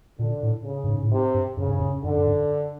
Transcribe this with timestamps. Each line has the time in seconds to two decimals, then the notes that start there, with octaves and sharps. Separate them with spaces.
0.19 A#2 D3
0.43 A2
0.65 C#3
0.84 G2
0.89 G#2
1.03 A2
1.11 G#2 C3
1.34 G2
1.57 F#2 C#3
1.68 G2
1.80 F#2
2.04 F#2 D3
2.17 F#2
2.27 G2